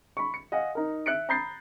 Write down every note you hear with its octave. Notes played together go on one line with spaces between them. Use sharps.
B5 C#6
C#7
D#5 F5 F#5 G#5
D#4 A#4
E5 F#6 C#7 D7
A#5 B5 D#6 G6 A6 C7